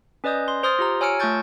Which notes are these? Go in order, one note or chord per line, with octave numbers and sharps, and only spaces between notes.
C#4 B4 D5 D#5 D#6 G6
C6
C5 C6 D#6 F6 G#6 A6
F4 G4 A#5
C#5 G#5 E6 F6 C#7 D7
A3 F4 A5 C#6 G6 A6